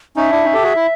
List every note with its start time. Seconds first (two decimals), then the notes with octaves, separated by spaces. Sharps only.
0.16 C#4 D#4 E5
0.31 D4 E4
0.44 C#4 D#4
0.54 G4 A4
0.63 F#4 G#4
0.76 E4